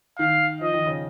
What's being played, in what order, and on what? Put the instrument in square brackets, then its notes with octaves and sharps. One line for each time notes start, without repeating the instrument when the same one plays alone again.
[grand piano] D#3 [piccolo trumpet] F5
[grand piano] F3 [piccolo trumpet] D#5
[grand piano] D#3
C#3